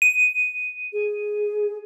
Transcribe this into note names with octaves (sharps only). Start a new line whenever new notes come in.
D#7
G#4